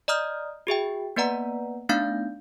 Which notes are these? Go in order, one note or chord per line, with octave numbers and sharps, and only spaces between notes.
D5 D#5 A#5 D#6 F6 G6
F#4 G#4 E5 G5
A#3 B3 B4 D5 F#5 A#5
A3 B3 D4 D#4 F5 G6